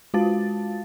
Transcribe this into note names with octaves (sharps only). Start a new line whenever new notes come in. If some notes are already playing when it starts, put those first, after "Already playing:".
G#3 F4 F#4 F5 A5 A6